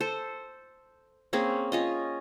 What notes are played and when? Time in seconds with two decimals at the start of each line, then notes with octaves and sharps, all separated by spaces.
0.01 A4 C5
1.33 A#3 C4 C#4 G#4
1.72 C#4 F4 D#5